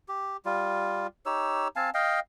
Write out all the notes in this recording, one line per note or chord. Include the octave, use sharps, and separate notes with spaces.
G4
G3 F4
D#4 G4 C#5 E6
C4 F5 G#5 A5
D#5 F5 G5